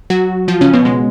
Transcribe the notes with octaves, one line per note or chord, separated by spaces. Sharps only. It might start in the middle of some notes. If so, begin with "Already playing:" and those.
F#3 F#4
F3 F4
C#3 C#4
B2 B3
G#3